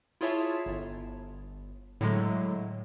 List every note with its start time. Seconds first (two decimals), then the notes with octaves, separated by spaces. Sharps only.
0.21 E4 F4 G#4 C#5 E5 A5
0.66 G1
2.01 A2 D3 F#3 G#3 A3